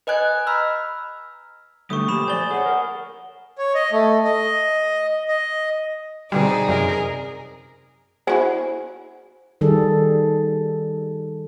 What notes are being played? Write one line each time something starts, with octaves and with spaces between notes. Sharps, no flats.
B4 D#5 G#5 F#6 G#6
A#5 B5 E6 F6
D3 G3 A3 C#6 D#6
A#2 F3 A#3 G4 B5 D#6 E7
C5 D5 G#5 G7
G#4 C#5 F#5 D#6
A#4
C#5
D#5
A3
D#5
D#5
B2 D3 G3 C4 D#4 G#4 D5
F#2 C3 G#4 A#4
E4 F#4 G#4 C5 F#5
D#3 G3 G#4 A4